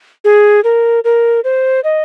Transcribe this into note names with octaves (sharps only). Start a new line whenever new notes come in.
G#4
A#4
A#4
C5
D#5